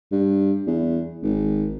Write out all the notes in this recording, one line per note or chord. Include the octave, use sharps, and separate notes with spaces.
G2
E2
G#1